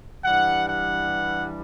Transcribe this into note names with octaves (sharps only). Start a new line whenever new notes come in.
G2 E3 G3 F#5
F#5